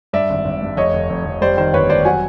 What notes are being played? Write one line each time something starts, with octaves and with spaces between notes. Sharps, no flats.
G2 D5 E5
G#1
G#1
G2
F1 C#5 D#5
F1
F1
F1
G3 C5 D5
D#3 C5
G1 B4 C#5
G3 C5 D5
F#3 F#5 G#5